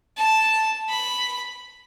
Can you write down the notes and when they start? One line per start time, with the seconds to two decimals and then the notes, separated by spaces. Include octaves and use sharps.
0.18 A5
0.89 B5